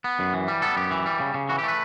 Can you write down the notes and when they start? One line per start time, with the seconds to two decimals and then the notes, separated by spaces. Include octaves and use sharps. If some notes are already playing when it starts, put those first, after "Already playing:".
0.04 B3
0.19 F#2
0.34 E3
0.48 G3
0.62 B3 A4
0.77 F#2 G4
0.91 E3
1.06 G3
1.20 C#3
1.34 C#3
1.49 E3 F#4
1.58 G4
1.64 A3 B4